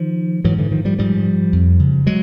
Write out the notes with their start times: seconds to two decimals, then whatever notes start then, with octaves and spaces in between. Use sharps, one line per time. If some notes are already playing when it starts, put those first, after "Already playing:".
Already playing: D#3 F3
0.44 G#2 E3 F#3
0.58 D3 E3
0.72 D#3 F3
0.85 F3 G3
0.98 G#2 F3 G3
1.52 F2
1.79 C#3
2.07 F#3 G#3